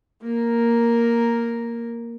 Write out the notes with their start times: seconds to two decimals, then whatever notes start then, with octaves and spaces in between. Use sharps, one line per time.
0.22 A#3 A#4